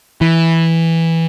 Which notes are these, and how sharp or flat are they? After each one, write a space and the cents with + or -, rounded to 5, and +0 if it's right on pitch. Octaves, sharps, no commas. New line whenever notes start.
E3 -5